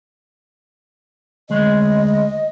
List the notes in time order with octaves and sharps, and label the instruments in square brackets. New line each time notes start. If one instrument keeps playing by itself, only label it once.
[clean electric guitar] D2 G#3 [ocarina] D#5